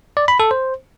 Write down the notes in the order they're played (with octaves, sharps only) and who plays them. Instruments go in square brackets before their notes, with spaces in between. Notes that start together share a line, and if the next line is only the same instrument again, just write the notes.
[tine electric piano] D5
B5
A4
C5